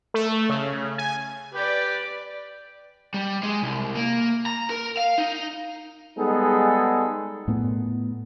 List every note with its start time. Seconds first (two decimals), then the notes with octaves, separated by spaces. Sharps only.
0.14 A3
0.49 C#3
0.98 G#5
1.54 G4 B4 D5
3.14 G3
3.43 G#3
3.63 C2
3.96 A#3
4.46 A#5
4.70 A#4
4.97 F5
5.18 D#4
6.17 G3 G#3 B3 D#4 G#4 A4
7.48 A2 A3 B3